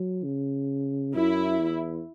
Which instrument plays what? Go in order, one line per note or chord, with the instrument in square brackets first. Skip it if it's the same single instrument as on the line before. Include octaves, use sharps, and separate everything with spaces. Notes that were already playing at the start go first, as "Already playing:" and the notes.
Already playing: [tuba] F#3
C#3
[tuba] F#2 [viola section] E4
[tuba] E2